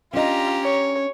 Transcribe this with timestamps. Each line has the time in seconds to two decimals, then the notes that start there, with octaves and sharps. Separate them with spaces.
0.14 C#4 D4 F4 G4 D#5 A#5
0.63 C#5